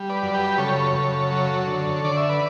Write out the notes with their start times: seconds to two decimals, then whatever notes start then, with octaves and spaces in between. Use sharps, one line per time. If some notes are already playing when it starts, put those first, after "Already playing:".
Already playing: G3
0.09 B4 D5
0.22 F#2
0.34 G4 B4
0.58 C#3 A4 C#5
0.96 F#2
1.32 F#3
1.67 D3
2.04 D3 D5
2.17 E5
2.29 B4 D5